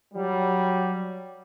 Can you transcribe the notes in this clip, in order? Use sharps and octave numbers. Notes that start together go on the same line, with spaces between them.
F#3 G3